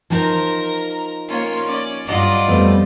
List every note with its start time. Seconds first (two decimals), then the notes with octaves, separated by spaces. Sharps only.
0.10 F3 D#4 A#4 C5 A#5
1.28 A#3 C#4 F4 C#5
1.67 C#4 D5
2.06 G2 F#3 F4 D5 D#5
2.48 F2 G3 A3 B3 C4